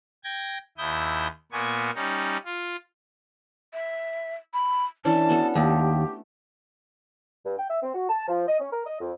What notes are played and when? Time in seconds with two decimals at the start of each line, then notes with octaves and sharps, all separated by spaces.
0.24 G5 G#6 A#6
0.78 D#2 E4 D#6 G6
1.52 A#2 A#3 B3 G#5 C#6
1.95 G3 C#4 D#4
2.45 F4
3.73 E5
4.54 B5
5.05 E3 C#4 D4 A5
5.29 B3 F#4 A4
5.55 D#2 A3 G4
7.45 G2
7.58 G5
7.70 E5
7.83 C4
7.95 F#4
8.09 A5
8.28 F3
8.48 D#5
8.60 C#4
8.72 A#4
8.86 D#5
9.00 F2